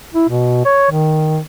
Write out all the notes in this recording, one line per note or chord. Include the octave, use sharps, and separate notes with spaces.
E4
B2
C#5
D#3